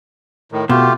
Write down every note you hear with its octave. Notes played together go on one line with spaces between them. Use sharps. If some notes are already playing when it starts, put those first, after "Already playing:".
A2 D#3
B2 A3 F4 G4